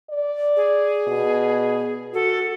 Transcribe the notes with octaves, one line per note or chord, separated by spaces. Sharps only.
D5
G#4
B2
F#4 A4